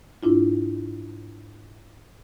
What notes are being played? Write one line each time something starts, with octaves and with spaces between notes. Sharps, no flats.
G#2 D4 E4 F4